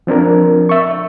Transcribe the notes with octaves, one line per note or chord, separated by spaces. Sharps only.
F3 C4 D4 A#4
E5 C#6